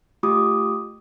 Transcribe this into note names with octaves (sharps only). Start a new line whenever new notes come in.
A3 F4 G4 D6 D#6